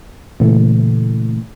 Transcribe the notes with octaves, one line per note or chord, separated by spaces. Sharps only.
A#2 C#3 E3 A3